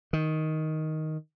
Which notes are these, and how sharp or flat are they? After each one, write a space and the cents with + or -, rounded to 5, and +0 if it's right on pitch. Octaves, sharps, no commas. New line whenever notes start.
D#3 +5